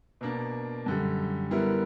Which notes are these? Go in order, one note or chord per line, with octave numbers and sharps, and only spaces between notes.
B2 A#3 D4
F#2 D3 G3
D3 G3 B3 E4 A#4